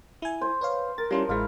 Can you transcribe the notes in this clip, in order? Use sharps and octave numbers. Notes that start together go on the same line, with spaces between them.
E4 G#5
C5
B4 C#5 F5
A#4 A6
F3 G3 C#4 E4
A1 G#3 E4 F5